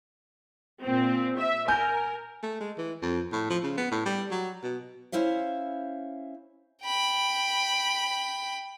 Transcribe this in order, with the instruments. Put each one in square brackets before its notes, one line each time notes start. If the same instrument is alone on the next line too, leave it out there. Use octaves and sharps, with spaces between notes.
[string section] A#2 C4
E5
[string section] A#4 [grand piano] G#5 G6
[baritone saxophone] A3
G#3
E3
F2
A2
F3
C#3
B3
A2
G3
F#3
B2
[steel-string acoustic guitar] C#4 E4 C5 E5 F5
[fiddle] G5 B5